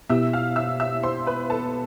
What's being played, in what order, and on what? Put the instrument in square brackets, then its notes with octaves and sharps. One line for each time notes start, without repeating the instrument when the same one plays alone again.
[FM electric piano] B2 B3 E4 G4 [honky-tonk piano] E5 E6
[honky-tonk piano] F5 F6
E5 E6
E5 E6
C5 C6
B4 B5
A4 A5